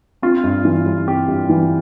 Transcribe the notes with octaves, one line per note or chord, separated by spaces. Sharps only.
C4 F4
G2
E3
G3
C4 G4
G2
E3